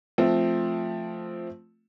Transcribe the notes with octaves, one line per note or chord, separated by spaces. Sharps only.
F3 A3 C4